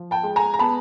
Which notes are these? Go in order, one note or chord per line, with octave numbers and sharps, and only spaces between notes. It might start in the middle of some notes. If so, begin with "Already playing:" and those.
Already playing: F3
G5 A5
G#3
G#5 A#5
A#5
B3 A5 B5